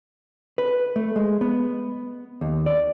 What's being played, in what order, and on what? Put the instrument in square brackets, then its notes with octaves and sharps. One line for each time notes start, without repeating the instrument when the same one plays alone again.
[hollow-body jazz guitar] B4
A3
G#3
B3
D#2
D5